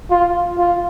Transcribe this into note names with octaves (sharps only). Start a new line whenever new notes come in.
F4
F4